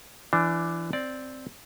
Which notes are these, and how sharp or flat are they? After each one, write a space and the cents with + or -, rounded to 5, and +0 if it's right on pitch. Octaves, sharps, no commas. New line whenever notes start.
E3 +25 D4 +0
C4 +0 D5 +0